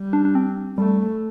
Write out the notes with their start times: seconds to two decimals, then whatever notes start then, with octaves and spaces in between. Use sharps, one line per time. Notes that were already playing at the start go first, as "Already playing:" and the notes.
Already playing: G3
0.13 D4
0.25 D4
0.35 C4
0.78 G3 A3